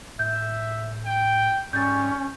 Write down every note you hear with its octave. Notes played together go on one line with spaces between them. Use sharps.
A2 E5 G6
G5
G#2 G3 G#3 C#4 C#5 G6 A6